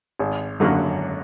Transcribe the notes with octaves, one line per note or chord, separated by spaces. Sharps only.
G#1
F#2 D3 F#3 A#3